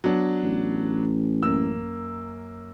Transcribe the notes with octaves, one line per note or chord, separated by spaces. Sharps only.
F#3 B3 D4
A1
F#2 A#3 E6